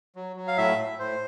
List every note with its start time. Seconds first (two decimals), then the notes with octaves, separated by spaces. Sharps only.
0.16 F#3
0.36 F#3
0.48 F5
0.57 A2 E5
0.78 A2
0.99 A2 C5